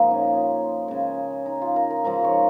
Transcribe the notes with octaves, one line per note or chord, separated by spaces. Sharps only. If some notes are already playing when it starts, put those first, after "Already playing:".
Already playing: A#2 F3 G#3 D#4
C#4
C#3 G#3
D#4
F4
A#4
A#4
G#2 F3 G#3 A#4
C#5